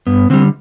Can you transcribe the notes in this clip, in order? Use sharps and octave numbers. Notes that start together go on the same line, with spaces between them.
G2 B3
D3 G3 C4